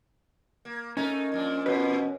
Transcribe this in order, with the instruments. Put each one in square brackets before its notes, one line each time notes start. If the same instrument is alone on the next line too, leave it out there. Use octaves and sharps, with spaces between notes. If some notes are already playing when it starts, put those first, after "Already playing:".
[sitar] A#3
[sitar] A3 D#4 A#4 [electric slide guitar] C#4
[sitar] A#2 F3 D4
[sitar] E2 [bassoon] B2 [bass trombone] C#4 [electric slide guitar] B4 C5